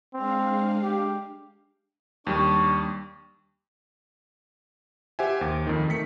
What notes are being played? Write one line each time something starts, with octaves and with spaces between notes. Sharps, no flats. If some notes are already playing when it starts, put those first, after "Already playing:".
G#3 C4 D4 F5
G4
D#2 G3 D4 C#6
G4 C5 E5 F#5 G#5
D#2 D6
F2 D#3
D#3 A3 B6 C#7